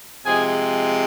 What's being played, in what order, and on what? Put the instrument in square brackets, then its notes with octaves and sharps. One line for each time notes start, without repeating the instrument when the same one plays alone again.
[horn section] C3 F3 G#3 G#4 G#5